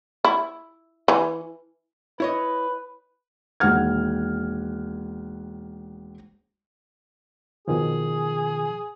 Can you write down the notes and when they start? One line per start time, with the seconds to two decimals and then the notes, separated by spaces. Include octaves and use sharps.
0.24 E4
1.08 E3
2.20 E4 B4 C#5 D#5
3.60 E1 D#2 F#5 F6 G#6
7.68 B2 D#3 F3 G#4